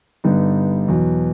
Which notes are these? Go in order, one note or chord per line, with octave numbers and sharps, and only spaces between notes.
G2 D3 G3 B3 D#4
E2 B2 F#3